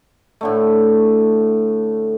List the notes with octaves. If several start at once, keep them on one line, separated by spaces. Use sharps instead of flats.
A2 D3 A3